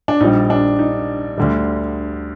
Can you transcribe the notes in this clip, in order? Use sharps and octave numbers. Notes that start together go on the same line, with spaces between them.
D4
A#1 A#2 G3 D#4
D4
D#4
D2 D3 G3